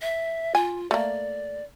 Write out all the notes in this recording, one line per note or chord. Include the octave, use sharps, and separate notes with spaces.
E5
F4 G#5
A3 A#3 D5